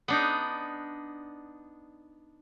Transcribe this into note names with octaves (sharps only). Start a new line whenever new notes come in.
B3 D4 D#4